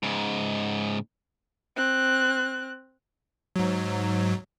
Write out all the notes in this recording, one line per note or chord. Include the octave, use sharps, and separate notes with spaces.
G#2 C#3
C4 F#6
G#2 F#3